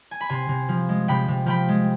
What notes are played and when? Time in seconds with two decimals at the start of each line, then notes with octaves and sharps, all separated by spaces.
0.11 G#5
0.21 B5
0.29 C3 G#5 C6
0.49 C3
0.69 F3
0.89 G#3
1.08 C3 G5 B5
1.28 C3
1.46 F3 G5 B5
1.69 G#3